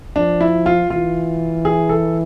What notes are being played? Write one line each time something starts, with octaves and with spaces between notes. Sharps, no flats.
F3 D4
E4
F4
E3 F4
G#4
A4